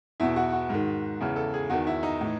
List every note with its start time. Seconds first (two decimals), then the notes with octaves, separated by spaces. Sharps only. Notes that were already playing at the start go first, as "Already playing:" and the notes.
0.20 E2 B2 E4
0.36 F#4
0.53 F#4
0.70 G#2 D#3
1.21 E2 C#3 E3
1.36 A4
1.54 G#4
1.70 E2 D#3 F#4
1.87 E4
2.03 D#4
2.21 A2 E3